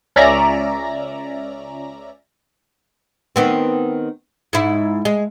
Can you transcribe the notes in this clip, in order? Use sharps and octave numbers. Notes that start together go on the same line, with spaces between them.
C#2 C#4 D5 E5 A#5 A#6
D#3 B3 C4
G#2 E4
G#3